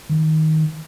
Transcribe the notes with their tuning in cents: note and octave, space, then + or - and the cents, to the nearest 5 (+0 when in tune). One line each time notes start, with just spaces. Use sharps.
D#3 +15